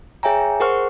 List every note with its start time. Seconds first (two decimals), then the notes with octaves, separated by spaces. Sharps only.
0.23 G#4 C#5 E5 G5 G#5 A#5
0.60 G#4 A#4 C5 F#5 C#6 F6